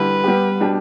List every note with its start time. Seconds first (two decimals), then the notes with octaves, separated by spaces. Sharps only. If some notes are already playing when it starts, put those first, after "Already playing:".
Already playing: D3 G3 E4 B4
0.24 G3 B3 G4
0.60 B2 G3 D4 G4